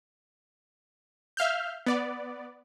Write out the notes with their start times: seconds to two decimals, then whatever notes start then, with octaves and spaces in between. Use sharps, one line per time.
1.37 E5 F5 F6 G6
1.86 B3 D5